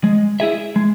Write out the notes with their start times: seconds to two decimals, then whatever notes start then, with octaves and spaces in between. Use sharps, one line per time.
0.04 G#3
0.40 E4 G#4 E5
0.76 G#3